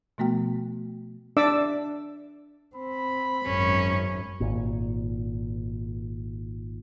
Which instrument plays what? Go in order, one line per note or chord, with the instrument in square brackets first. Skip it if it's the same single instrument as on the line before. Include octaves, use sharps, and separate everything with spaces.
[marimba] B2 F3 A3 B3 F#4 G5
[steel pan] D4 D5 E5 D6 E6
[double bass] C4 [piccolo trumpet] B5
[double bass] G#1 F#2 [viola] C#4
[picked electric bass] G#1 A#2